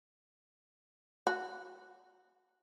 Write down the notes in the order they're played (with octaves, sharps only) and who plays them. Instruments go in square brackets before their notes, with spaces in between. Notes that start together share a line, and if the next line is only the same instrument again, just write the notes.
[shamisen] F#4